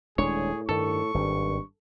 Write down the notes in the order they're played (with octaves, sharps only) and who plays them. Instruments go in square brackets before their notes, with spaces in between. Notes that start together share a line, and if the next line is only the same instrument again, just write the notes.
[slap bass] D#1 G#3 D4 [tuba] A2 [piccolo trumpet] G#4 [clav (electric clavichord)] C#5
[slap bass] G2 D#3 [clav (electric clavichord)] A4 [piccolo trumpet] C#6
[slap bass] G#1 D#3 [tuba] G2